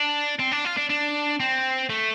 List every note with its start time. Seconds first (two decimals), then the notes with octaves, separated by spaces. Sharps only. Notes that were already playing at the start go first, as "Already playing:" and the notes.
Already playing: D4
0.39 C4
0.51 D4
0.65 F4
0.77 D4
0.89 D4
1.40 C4
1.90 A3